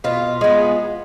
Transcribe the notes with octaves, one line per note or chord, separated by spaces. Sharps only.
B2 F4
G#3 B3